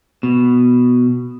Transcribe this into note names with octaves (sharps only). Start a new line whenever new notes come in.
B2